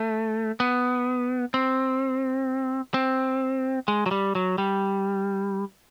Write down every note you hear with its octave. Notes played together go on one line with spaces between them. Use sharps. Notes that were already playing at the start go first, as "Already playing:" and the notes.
Already playing: A3
B3
C4
C4
G#3
F#3
G3
F#3
G3